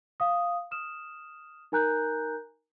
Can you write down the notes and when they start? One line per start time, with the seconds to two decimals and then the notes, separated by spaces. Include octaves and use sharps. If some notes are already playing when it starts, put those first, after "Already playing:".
0.20 F5 D#6
0.71 D#6 F6 E7
1.72 D#4 A#4 G#5 A#5 F#6 G6